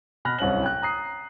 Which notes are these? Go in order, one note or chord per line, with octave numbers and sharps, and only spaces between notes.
B2 B5 F6 F#6 A#6
D1 C2 C#4 F#7
G5 F#6
A#5 D#6 C7